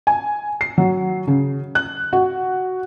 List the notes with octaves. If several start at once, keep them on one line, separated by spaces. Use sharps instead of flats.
G#5
C7
F#3
C#3
F#6
F#4